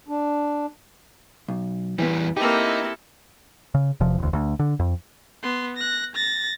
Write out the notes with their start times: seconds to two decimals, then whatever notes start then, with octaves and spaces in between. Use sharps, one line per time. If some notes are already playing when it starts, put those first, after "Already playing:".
0.08 D4
1.48 B1
1.98 E2 E3 G3 B3
2.37 A#3 C4 D#4 E4 G4 A4
3.74 C#3
4.00 E1 C3 F3
4.18 E1 D2
4.33 D2
4.59 D3
4.79 F2
5.43 B3 C6
5.76 F#6 A#6
6.15 A6 A#6